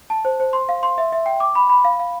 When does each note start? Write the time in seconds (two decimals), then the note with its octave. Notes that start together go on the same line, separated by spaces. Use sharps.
0.10 A5
0.25 C5
0.40 C5
0.53 C6
0.69 F5
0.83 C6
0.98 E5
1.12 E5
1.26 G5
1.40 D6
1.55 B5
1.70 B5
1.85 F5
2.00 F5